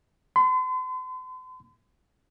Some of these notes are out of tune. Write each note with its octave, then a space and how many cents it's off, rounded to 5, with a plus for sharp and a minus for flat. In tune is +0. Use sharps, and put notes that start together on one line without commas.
C6 -45